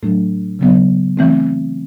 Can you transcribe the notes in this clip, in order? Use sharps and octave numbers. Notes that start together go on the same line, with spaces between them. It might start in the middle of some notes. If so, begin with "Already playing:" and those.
A2 F#3 A3 D4
C#3 F#3 B3
E3 A3 C4